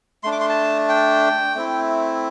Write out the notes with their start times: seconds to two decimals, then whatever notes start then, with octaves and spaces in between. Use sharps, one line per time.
0.23 A3 D4 C6
0.32 D6
0.40 C6
0.49 A5
0.89 G5
1.55 A3 C4 E4